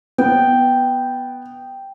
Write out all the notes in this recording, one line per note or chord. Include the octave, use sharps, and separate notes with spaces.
B3 G5